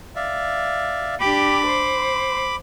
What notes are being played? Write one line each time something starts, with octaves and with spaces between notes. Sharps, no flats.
D5 E5 F5
D4 G4 B5 D6
C5